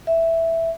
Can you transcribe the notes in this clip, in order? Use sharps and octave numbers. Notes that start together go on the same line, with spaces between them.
E5